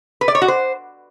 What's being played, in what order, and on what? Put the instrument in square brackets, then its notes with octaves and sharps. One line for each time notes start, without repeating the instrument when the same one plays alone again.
[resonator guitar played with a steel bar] B4
D5
C#5
F#4
C5